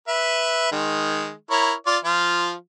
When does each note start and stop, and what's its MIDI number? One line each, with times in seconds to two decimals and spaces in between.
0.08 0.70 71
0.08 0.70 76
0.72 1.32 51
0.72 1.32 56
1.51 1.73 64
1.51 1.73 70
1.51 1.73 73
1.86 1.98 65
1.86 1.98 74
2.04 2.53 53
2.04 2.53 65